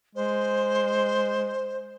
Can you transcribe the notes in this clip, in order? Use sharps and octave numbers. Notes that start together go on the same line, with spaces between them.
G#3 C5